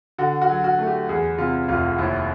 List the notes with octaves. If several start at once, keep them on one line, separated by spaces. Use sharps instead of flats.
D3 F#4
F#4
F#3
F#4
A3
G4
E2 G#4
C3 F4
F1 F4
D#2 E4